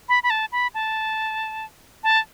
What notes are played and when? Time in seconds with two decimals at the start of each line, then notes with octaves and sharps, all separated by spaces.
0.09 B5
0.23 B5
0.30 A5
0.52 B5
0.74 A5
2.04 A5